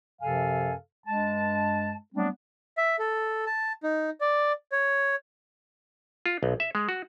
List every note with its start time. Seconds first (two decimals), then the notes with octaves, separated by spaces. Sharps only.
0.22 F#2 C3 F3 A4 F5 G#5
1.06 G2 G#3 A5
2.14 F#3 G3 A3 B3 C4 D4
2.77 E5
2.99 A4
3.46 A5
3.83 D#4
4.21 D5
4.72 C#5
6.26 F4
6.43 B1
6.60 E5
6.75 G#3
6.89 F#4